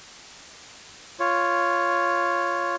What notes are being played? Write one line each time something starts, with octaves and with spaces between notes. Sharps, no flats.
F4 C#5